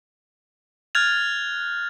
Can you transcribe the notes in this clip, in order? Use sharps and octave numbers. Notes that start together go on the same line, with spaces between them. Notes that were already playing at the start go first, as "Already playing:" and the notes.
F6 F#6 G#6 A6 F7